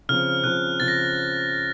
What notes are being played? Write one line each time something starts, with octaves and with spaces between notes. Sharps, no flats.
C#3 F3 C4 F6
C#3 F3 C4 F#6
C#3 F3 C4 A6
A#6